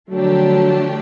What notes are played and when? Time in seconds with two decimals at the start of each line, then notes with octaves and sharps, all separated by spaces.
0.10 D3 F3 F#3 A3 D4 G4